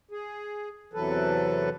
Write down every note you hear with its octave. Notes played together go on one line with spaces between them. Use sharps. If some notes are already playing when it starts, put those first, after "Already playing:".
G#4
E2 C3 E3 F#3 A4 B4